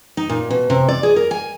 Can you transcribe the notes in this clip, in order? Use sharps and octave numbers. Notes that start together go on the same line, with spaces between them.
D#4
A#2
B2
C3
D5
G#4
A#4
G#5